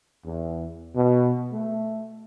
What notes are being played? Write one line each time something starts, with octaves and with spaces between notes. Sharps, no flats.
E2
B2
A3